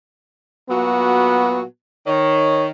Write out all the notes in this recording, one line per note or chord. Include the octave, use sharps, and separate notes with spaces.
A#2 F#3 B3 F#4
D#3 C#5